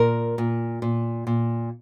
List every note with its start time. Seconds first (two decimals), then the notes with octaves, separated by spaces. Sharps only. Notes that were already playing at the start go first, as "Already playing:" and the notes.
Already playing: A#2 A#4
0.38 A#2
0.82 A#2
1.27 A#2